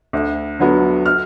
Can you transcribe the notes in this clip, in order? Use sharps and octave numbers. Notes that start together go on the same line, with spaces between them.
D2
D3 F#3 B3
F6